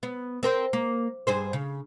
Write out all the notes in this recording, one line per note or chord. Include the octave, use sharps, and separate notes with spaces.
B3
C4 A#4 C5
A#3
G2 G#4 C5
C#3